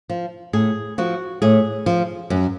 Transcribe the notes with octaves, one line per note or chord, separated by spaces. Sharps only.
F3
A2 G#4
F3 F#4
A2 G#4
F3
F#2